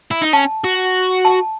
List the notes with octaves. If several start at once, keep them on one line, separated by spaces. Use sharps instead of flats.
E4
D#4
C#4 A5
F#4
A5